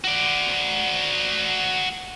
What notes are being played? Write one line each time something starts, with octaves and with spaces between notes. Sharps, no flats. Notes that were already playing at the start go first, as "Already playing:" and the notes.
F#4 D5